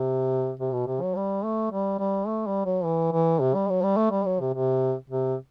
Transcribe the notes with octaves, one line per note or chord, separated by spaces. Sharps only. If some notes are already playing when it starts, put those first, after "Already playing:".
Already playing: C3
C3
B2
C3
F#3
G3
A3
G3
G3
A3
G3
F#3
E3
E3
C3
G3
F#3
G3
A3
G3
F#3
C3
C3
C3